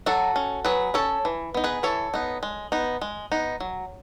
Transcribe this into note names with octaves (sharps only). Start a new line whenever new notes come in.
F#3 F#4 A4
C#4
F#3 G#4 B4
C#4 A4 C#5
E3
B3 D#4
G#4 B4
E3 A4 C#5
B3 D#4
G#3
B3 D#4
G#3
B3 D#4
F#3